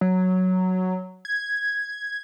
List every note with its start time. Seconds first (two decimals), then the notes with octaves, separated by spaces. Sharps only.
0.01 F#3
1.25 G#6